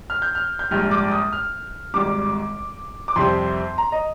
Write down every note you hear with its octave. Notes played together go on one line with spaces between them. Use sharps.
F6
G6
F6
G6
A#1 G#2 G3 F6
D6
D#6
F6
G#1 G#2 G3 D6
D6
F2 C3 G3 C4 C6
A#5
D#5